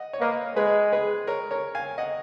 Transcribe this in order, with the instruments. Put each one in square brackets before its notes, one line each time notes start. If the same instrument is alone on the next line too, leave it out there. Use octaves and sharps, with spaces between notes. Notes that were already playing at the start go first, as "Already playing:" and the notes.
Already playing: [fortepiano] D#5 F#5
C#5
[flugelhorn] A#3 [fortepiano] B4 D#5
[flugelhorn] G#3 [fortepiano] G#4 B4
[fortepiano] G#4 B4
A#4 C#5
A#4 C#5
F5 G#5
D#5 F#5